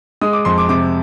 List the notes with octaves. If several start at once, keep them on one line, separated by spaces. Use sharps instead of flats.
G#3 D#6
D6
F2 C6
D6
C3 D6